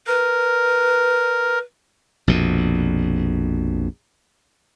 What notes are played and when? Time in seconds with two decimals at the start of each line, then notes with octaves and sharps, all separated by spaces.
0.07 A#4 B4
2.28 A#1 F2 B2